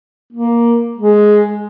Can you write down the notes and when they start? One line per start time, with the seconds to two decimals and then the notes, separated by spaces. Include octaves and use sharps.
0.33 A#3
0.97 G#3